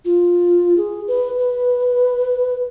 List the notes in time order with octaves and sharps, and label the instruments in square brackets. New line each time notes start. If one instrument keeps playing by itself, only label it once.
[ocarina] F4
G#4
B4
B4